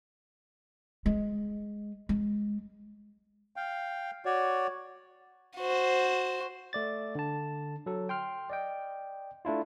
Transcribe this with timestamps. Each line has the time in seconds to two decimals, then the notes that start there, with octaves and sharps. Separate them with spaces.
1.06 G#3
2.09 G#3
3.56 F5 G5
4.25 F#4 C#5 D5
5.57 F#4 C5
6.73 A3 D5 A6
7.15 D3 A5
7.86 F#3 A4
8.09 G5 C6 F6
8.50 D5 D#5 G5
9.45 A3 D4 E4 F4